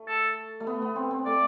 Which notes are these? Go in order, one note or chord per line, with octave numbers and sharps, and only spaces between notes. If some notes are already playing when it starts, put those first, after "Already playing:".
Already playing: A3
A4
A3
B3
B3
C4
C4
A3 D5